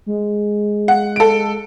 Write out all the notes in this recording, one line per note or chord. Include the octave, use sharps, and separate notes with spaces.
G#3
F#5
A4 D7